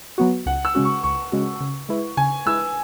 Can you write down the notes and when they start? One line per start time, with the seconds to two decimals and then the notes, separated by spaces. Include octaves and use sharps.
0.18 F#3 B3 F#4
0.46 C#2 F#5
0.65 E6
0.75 C#3 G#3 C#4 F#4
0.85 C#6
1.03 C#2 C#6
1.32 C#3 G#3 C#4 F#4
1.60 C#3
1.89 G#3 E4 B4
2.17 C#3 G#5
2.46 G#3 E4 B4 E6